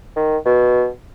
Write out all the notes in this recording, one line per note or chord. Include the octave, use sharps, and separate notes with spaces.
D#3
B2